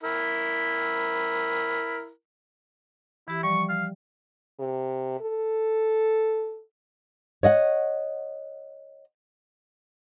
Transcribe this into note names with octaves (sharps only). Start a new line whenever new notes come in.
E4 A#4
E3 E4 G4
F3 G3 D5 C#6
F5
C3
A4
C#5 D#5 F5 F#5